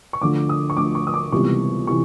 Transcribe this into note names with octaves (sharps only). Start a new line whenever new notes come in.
C#6
D2 D3 F3 D6
D#6
C#6
D2 D3 F3 D6
C#6
D#6
D6
C#2 C3 E3 G3 B3 C#6
C3 E3 C#6